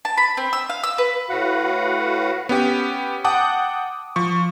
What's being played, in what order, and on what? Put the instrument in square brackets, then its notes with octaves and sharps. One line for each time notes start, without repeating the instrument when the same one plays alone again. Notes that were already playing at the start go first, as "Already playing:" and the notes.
[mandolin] A5
B5
C4
E6
F5
E6
B4
[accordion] A2 F#4 B4 F5 F#5
[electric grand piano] B3 C#4 G4
F#5 G5 A5 D6 D#6
F3 C#6